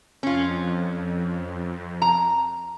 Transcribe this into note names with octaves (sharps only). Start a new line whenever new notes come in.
F2 C#4 F4
A#5